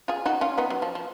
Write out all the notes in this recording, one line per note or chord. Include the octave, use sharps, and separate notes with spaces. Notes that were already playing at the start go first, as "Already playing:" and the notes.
F4 G#4
D#4 F#4
C#4 F4
B3 D#4
F#3
F3
F3